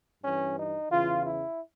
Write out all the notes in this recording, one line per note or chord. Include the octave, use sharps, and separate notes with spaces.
G2 E3 C#4
D#4
E2 C#3 E3 F4
E4